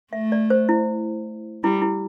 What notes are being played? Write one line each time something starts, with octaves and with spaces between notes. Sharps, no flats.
A3 E5
D5
C5
E4
G3 E4
E4